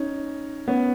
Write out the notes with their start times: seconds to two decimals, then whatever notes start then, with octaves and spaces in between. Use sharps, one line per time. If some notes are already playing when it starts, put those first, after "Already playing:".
Already playing: C#4 D#4
0.68 B3 C#4